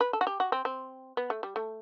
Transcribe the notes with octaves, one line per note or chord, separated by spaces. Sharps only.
B4
A4
F#4
G4
F#4
C4
C4
B3
A3
G3
A3